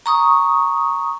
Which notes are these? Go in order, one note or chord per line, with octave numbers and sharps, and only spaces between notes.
A#5 C#6 D#6